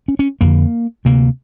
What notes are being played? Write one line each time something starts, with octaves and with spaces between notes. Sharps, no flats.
C#4
C#4
F2 D3 A#3
D2 C3 A#3